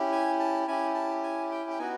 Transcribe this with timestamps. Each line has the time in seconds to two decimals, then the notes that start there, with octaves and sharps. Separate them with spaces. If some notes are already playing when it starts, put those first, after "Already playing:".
Already playing: C#4 E4 G4
0.12 G#5
0.40 A5
0.68 C#4 E4 G4 G#5
0.95 A5
1.23 G#5
1.51 G5
1.70 G5
1.79 B3 D#4 F#4 G#5